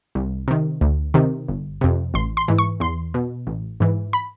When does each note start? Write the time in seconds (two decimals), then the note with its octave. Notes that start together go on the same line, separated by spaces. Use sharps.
0.15 C2
0.48 C3 D#3
0.81 D2
1.14 C3 D#3
1.48 G1
1.81 F2 C3
2.14 A1 C6
2.37 C6
2.48 G#2 E3
2.58 C#6
2.80 E2 C6
3.14 B2
3.47 A1
3.80 G#2 E3
4.13 B5